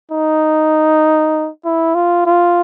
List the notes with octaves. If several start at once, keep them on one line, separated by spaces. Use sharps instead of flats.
D#4
E4
F4
F4